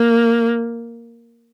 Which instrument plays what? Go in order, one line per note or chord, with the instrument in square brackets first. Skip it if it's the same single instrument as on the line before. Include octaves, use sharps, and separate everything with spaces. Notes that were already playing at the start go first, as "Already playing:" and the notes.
Already playing: [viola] A#3